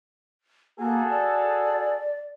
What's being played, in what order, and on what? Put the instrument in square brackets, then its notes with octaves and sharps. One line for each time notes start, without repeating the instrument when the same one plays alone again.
[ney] A#3 [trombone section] F#4 G#4 A4
[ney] D5